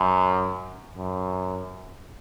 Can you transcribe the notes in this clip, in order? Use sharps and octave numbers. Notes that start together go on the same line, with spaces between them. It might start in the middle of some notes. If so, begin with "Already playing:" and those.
Already playing: F#2
F#2